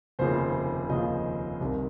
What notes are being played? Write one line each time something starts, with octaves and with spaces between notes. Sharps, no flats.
F1 D#2 C#3 F3 C5
F1 D#2 C#3 F3 D#5
C2 C3 D#3